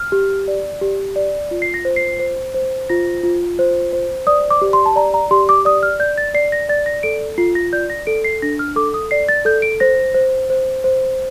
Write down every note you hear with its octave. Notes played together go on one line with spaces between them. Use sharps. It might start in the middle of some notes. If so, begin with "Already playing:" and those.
Already playing: F6
G4
D5
G4
D5
F4
C7
A#6
C5
C7
C5
C5
F4 A#6
F4
C5
C5
D5 D#6
D6
G4
C6
A5
D5 A#5
A#5
G4 C6
D6
D5 D#6
F6
D5 G6
A6
D5 C7
A#6
D5 A6
A#6
A4 D7
F4 C7
A#6
D5 G6
A#6
A4 D7
C7
D4 A#6
F6
A4 D6
D#6
D5 C7
A6
A4 G6
D7
C5 A#6
C5
C5
C5